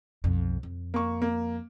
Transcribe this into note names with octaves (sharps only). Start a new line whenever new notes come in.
B1 F2
F2
A#3 C#6
A#3